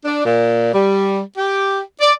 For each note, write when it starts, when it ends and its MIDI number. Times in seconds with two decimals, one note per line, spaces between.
0.05 0.24 62
0.25 0.72 46
0.73 1.20 55
1.37 1.81 67
2.01 2.13 74